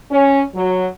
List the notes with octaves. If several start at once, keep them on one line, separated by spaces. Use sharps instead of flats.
C#4
F#3